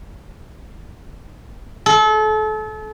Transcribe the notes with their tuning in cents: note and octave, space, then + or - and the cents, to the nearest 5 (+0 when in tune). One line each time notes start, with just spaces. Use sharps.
A4 -35